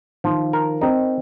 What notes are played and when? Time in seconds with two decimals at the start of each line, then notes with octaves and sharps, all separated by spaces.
0.24 D#3 F3
0.53 A#4
0.81 C4 D#4